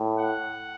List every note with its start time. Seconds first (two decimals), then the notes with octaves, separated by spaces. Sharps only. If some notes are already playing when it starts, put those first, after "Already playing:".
Already playing: A2
0.19 F#5